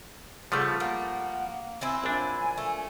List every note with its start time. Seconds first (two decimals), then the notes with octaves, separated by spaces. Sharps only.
0.52 C#3 F3 G3 A3 B3
0.80 A#3 F#5
1.81 F#3 C4 E4 G#5
2.04 A#1 D4 G#5
2.58 A3